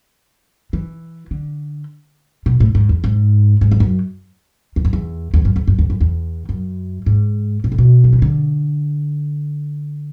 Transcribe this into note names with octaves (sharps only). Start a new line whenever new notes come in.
E3
D3
B2
A2
G#2
E2
G#2
G#2
E2
F#2
E2
F#2
E2
E2
F#2
E2
F#2
E2
F#2
E2
F#2
G#2
B2
A2
B2
F#3
E3
D3